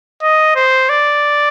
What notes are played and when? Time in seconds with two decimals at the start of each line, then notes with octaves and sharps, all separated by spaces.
0.22 D#5
0.55 C5
0.89 D5